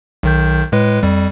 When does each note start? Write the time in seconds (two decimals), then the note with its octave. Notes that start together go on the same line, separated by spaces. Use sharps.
0.23 B1 D#3 G6
0.72 A2 G#3 B4
1.03 F2 G3